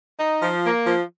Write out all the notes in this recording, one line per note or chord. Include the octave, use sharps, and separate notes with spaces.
D#4
F3
A#3
F3